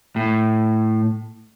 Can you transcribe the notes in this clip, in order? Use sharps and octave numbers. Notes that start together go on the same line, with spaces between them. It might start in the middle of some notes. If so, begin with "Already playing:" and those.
A2